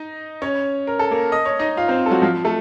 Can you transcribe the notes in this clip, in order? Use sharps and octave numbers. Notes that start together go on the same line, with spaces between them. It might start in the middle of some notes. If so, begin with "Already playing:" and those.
Already playing: D#4 D#5
C#4 C#5
A#4
A4
A#3 A#4
D#5
C#5
D#4 D#5
F4 F5
C4 C5
A4
F#3 F#4
F3 F4
A3 A4